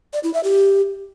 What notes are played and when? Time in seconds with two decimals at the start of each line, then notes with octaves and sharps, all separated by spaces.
0.13 D5
0.23 E4
0.34 E5
0.44 G4